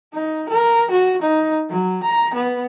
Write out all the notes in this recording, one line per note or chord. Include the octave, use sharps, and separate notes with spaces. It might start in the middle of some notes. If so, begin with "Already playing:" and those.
D#4
A#4
F#4
D#4
F#3
A#5
B3